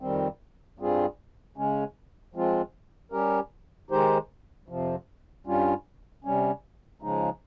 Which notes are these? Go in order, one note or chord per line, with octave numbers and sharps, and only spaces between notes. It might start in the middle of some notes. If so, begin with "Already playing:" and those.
F2 D#3 G3 C4
G2 G3 C4 F4 G#4
C#3 G#3 C#4
F3 G#3 C4 F4
G3 C#4 G4 A#4
D#3 G#3 D#4 G4 C5
F2 C3 F3
G2 G3 C#4 F4
C3 G3 C#4
C#3 F3 G#3 D#4